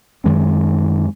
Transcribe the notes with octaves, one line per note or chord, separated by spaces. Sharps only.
F#2 D#3 G#3 C4